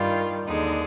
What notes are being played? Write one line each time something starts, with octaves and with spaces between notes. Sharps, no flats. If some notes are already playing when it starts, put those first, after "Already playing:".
Already playing: G2 D#3 G3 F4
D#2 D3 G#3 D#4